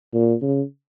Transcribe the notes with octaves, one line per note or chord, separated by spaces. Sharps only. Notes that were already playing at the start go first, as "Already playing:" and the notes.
A#2
C#3